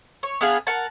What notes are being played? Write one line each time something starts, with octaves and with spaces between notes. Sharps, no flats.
C#5
B3 D4 G#4 F5
A#4 F#5 A5